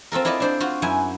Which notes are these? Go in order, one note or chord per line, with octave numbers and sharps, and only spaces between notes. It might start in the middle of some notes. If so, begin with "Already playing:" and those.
C4 F4 A4 A#4
E4 F4 A4 D5 D#5
D4 C5 D5
F4 F#4
F#2 E4 G#5